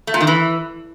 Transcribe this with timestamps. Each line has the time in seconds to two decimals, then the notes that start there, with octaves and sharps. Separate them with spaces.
0.07 A3
0.14 A#2
0.21 D#3
0.27 E3